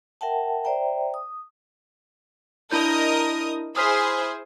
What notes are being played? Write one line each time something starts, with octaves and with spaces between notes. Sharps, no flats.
A#4 E5 F#5 G5 A5
C5 D5 E5 G5 A#5
D#6
D4 E4 A#4 D#5 D#6 G6
E4 G#4 C5 D#6 F6 B6